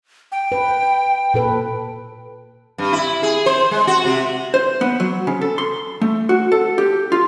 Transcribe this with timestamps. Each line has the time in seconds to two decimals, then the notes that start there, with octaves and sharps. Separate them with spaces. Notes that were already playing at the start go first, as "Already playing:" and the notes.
0.32 G5
0.52 B4
1.34 A#2 A4 B4
2.78 G2
2.93 E4
3.23 G#4
3.46 C5
3.71 G#3
3.87 F#4
4.05 C3
4.54 C5
4.81 B3
5.00 F#3
5.27 C#3
5.41 A4
5.58 C6
6.02 A3
6.29 F#4
6.52 A4
6.78 G4
7.12 F4